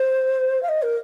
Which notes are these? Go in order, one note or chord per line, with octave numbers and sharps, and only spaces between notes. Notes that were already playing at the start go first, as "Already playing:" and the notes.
Already playing: C5
F5
D#5
A#4